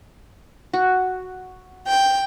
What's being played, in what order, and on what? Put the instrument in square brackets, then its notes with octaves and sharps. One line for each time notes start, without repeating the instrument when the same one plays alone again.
[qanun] F#4
[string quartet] G5